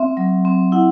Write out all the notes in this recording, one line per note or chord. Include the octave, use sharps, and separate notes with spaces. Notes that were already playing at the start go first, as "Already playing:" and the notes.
Already playing: C4 E5
F#3
C4
E4 F#5